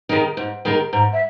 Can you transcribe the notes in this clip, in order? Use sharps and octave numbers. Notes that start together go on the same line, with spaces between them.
D#3 G#3 D#4 A#4
G#2
D#3 G#3 D#4 A#4
G#2 A#5
E5